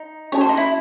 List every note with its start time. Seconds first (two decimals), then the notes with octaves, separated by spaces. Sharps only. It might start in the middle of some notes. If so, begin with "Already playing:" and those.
Already playing: D#4
0.32 C#4 F#4 A4 C#5 D#5 A5
0.41 C5
0.49 D#4
0.57 E4